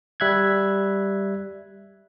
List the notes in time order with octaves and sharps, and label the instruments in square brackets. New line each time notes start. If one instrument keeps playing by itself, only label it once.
[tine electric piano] G3 E5 F#6 G#6